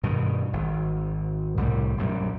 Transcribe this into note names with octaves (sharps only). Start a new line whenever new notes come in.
G2 B2 D#3
G#1
C2 A2 G3
A#1 F#2 G3